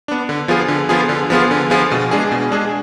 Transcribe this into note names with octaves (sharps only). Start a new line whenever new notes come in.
B3 D4
D3
F3 B3 F4 G#4
D3
F3 B3 F4 G#4
D3
F3 B3 F4 G#4
D3
F3 B3 F4 G#4
B2
G#3 D4 G#4
B2
G#3 D4 G#4